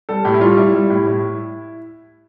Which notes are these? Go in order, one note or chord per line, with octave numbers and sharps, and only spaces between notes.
G3 A4
A2 G4
E4
G3 F4
G3 E4
G3
A2
A2